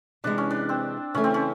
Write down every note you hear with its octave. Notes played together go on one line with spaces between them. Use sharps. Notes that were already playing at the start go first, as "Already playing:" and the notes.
C3 E3 G#3 D4
C#4
D4
C4
C#3 E3 A3 C#4
C4
C#4